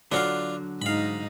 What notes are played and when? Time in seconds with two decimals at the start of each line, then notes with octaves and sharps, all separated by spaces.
0.12 D3 F#3 D4 F4 F5
0.82 G#2 D#4 F5 B5